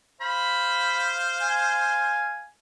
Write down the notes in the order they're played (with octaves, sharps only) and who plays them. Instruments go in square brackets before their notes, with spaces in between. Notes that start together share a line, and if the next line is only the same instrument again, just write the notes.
[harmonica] C5 F5 [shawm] B5
[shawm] G#5